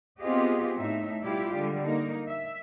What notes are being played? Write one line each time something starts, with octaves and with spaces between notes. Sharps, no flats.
B3 C4 F4 G4 G#4 D#5
A2 D#4 E5
B2 G3 E4 F4 G4
D3 G3 G#3
A#3 D#4
E5